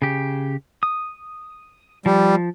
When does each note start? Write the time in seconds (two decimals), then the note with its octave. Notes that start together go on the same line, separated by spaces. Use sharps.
0.02 C#3 G4
0.83 D#6
2.06 F3 G3